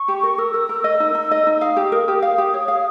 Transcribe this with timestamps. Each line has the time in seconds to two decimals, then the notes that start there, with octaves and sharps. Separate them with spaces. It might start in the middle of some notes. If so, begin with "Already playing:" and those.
Already playing: C#6
0.08 G4
0.23 A#4
0.38 A#4 E6
0.54 A#4
0.69 A#4
0.84 D#5
1.00 D#4
1.15 D#4
1.31 D#5
1.47 D#4
1.61 F5 D#6
1.76 G4
1.92 A#4
2.08 G4
2.22 F5
2.38 G4
2.54 C#5
2.68 F5